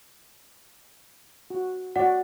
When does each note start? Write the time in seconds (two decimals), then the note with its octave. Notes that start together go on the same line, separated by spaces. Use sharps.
1.50 F#4
1.96 F#4 D5 F#5